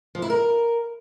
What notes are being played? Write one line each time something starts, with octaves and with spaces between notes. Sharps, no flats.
F3
E4
A#4